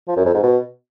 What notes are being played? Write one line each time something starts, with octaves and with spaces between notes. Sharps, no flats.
F3
F#2
F2
G#2
B2